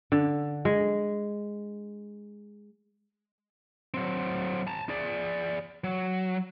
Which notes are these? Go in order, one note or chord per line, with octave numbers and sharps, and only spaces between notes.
D3
G#3
F#3 C4
A5 A#5
G#4 D5
F#3